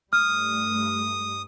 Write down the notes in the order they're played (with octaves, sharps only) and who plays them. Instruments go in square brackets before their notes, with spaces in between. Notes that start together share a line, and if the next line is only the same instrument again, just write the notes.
[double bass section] G2 G3 A3 [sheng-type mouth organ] D#6 [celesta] F6